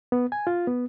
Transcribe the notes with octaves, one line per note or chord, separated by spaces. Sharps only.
B3
G#5
F4
B3